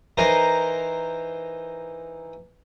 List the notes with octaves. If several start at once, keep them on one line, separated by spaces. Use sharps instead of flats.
E3 D#4 A#4 C5